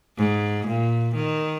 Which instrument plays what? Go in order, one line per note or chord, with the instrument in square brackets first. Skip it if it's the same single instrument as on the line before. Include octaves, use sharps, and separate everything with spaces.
[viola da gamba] G#2
A#2
D#3